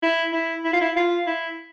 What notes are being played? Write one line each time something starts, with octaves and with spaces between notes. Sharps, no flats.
E4
E4
E4
F4
E4
F4
E4